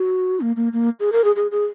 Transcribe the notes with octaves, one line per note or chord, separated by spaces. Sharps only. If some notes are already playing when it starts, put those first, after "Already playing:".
Already playing: F#4
A#3
A#3
A#3
G#4
A#4
G#4
G#4
G#4